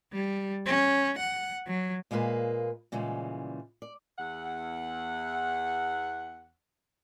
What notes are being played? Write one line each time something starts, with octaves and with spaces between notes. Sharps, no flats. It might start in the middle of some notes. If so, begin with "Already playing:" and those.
G3
C#4
F#5
F#3
A#2 G#3 A#3 A#4 B4
A#2 C#3 E3 G3 G#3
D5
E2 F#5